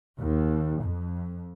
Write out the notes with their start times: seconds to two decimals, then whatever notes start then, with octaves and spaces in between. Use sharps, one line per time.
0.18 D#2
0.81 F2